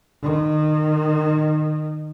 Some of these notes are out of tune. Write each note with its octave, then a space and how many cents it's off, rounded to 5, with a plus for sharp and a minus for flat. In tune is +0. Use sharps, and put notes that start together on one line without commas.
D#3 -25